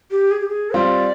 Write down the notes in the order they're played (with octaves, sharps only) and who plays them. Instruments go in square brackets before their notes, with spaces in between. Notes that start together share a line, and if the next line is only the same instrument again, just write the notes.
[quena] G4
G#4
G4
G#4
[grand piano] G3 C4 F4 C5 [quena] D5